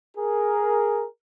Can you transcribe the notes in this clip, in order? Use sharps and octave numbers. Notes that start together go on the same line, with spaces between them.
G#4 A#4